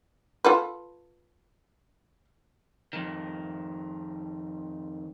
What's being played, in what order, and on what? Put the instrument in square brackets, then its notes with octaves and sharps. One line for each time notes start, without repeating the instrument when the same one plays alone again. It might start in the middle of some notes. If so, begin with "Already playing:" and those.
[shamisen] F4 A4 B4
[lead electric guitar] F2 D#3